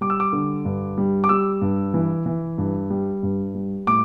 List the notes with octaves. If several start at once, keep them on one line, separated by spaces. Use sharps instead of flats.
G3 D6
E6
D6
D3
G2
G3
D6
G3 E6
G2
E3
E3
G2
G3
G2
G3
A2 D6